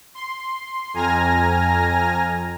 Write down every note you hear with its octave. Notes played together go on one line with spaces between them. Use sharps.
C6
F2 G#5 A#5 F6 A#6